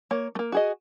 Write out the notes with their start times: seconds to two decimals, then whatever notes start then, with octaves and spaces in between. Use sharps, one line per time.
0.11 A#3 C#5
0.35 A3 A#3
0.52 F#4 G#4 D#5